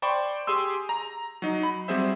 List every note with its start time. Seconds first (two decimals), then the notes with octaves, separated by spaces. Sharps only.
0.02 C5 D5 G5 B5 C#6
0.47 G4 G#4 G#5 C6 E6
0.89 A#5
1.42 F#3 D#4
1.63 B5
1.88 F#3 G3 C4 G#4 C5 E5